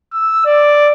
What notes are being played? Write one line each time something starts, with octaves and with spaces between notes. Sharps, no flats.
E6
D5